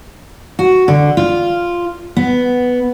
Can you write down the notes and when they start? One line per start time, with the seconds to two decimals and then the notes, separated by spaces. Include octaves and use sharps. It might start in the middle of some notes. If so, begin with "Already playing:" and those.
0.59 F#4
0.88 D3
1.17 F4
2.17 B3